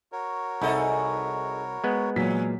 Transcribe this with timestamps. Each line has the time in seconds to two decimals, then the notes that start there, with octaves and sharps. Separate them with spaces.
0.12 F#4 A#4 C#5
0.62 C2 D#4 G#4 A4 E5 F#5 B5
1.84 G#3 B3
2.16 E2 A#2 F#3 C#4 B6